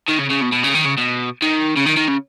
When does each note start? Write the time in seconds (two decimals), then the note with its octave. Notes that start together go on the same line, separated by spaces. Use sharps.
0.09 D#3
0.20 C#3
0.31 C#3
0.42 B2
0.53 B2
0.64 C#3
0.75 D#3
0.86 C#3
0.98 B2
1.42 D#3
1.77 C#3
1.86 D#3
1.97 D#3
2.08 C#3